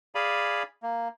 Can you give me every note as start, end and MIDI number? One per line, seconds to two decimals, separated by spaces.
0.15 0.63 68
0.15 0.63 74
0.15 0.63 77
0.15 0.63 80
0.15 0.63 83
0.83 1.08 58